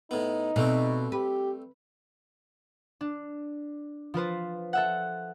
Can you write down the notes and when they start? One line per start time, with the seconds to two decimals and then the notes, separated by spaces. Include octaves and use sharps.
0.11 A2 B3 D#4
0.56 B2 G3 A3 C4
1.12 G4 B4
3.01 D4
4.14 F3 F4 B4 C5
4.73 A4 E5 F#5